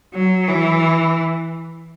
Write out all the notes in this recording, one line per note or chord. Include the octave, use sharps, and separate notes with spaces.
F#3
E3